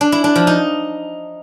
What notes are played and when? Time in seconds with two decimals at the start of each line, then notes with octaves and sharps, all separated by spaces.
0.01 D4
0.12 E4
0.24 D4
0.36 F3
0.47 D#4